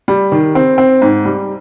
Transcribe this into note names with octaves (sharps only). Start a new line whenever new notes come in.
G3
D#3
C4
C4
G#2
G3